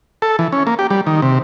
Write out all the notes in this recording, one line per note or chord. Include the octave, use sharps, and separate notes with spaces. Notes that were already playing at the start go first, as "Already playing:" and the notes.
A4
E3
C#4
A#3
G4
G3
D#3
C3